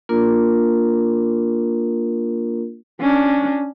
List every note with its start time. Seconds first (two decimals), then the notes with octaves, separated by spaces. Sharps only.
0.09 A#3 D4 F4 A#4
3.00 C#4 D4